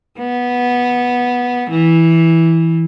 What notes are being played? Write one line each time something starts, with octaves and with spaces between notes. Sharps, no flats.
B3
E3